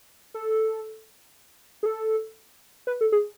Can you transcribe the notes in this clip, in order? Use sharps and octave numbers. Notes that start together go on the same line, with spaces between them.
A4
G#4
A4
B4
A4
G#4